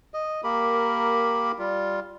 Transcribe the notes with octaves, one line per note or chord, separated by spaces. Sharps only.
D#5
A#3 G4 A#4 B5
G3 F4